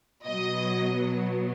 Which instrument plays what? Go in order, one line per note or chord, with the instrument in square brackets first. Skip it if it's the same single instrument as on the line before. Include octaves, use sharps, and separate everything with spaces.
[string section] B2 F#3 B3 D#5